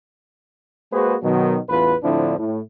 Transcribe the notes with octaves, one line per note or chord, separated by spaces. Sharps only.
G#3 A#3 F#4 G#4 B4 C5
B2 D#3 F#3
A1 E2 F4 B4
A2 D3 F3 C4 D4 E4
A2